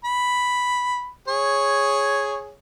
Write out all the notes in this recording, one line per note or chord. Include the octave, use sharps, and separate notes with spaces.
B5
G#4 C#5